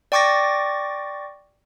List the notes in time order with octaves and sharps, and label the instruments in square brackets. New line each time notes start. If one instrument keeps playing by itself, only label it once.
[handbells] D5 G5 C#6 D6 A6 A#6